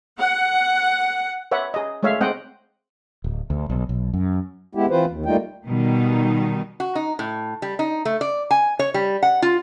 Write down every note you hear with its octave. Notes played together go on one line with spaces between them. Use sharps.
F#5
B4 C#5 E5 F#5
G#4 D#5
G#3 A3 C#5 E5 F5
G#3 C4 C5 D#5 F#5 G5
D1
D2
B1
B1
F#2
G#3 B3 E4 G4
E3 C4 F4 B4 C5
D#2
G3 A3 A#3 D#4 F4 G5
B2 D#3 G3 D#4
F#4
D#4
A2
G3
D#4
A3
D5
G#5
C#5
G3
F#5
F4